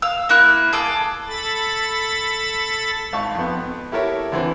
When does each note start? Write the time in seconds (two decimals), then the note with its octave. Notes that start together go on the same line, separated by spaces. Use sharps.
0.02 F5 E6
0.29 A#3 E4 F#6
0.73 G#4 A4 D6
1.27 A4 B5 A6
3.13 G#1 F5 A5 C#6
3.35 F2 B3
3.92 E4 G4 A4 A#4 C#5 E5
4.32 D3 E3 C4